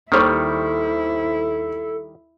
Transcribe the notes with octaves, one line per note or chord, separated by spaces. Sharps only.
D#2 D#3 G3 E4 A4 C5 C#6